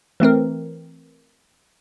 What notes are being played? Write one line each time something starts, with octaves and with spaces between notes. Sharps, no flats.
E3 A3 C4 A#4